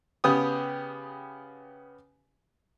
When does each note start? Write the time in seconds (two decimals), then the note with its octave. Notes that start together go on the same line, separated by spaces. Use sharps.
0.24 C#3 B3 G4 D#6